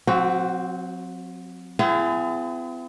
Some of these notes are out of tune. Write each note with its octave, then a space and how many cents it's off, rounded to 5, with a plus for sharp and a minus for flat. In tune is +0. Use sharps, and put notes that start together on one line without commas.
F#3 -35 C4 +0 F#4 +15
C4 -45 E4 +45 G#4 +0